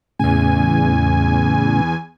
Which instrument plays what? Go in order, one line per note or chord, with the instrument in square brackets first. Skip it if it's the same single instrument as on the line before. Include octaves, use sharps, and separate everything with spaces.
[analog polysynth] E2 G#5 [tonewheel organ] A2 C#3